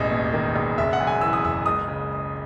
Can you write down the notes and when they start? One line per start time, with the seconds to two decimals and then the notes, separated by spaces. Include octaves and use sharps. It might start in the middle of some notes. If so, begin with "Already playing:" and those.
Already playing: E1 A1 D#5
0.11 D#2
0.33 D#3
0.56 E1
0.78 F#1 E5
0.93 F#5
1.00 F#2
1.07 G#5
1.21 E3 E6
1.33 D#6
1.45 F#1 E6
1.66 C#2 D#6
1.88 C#3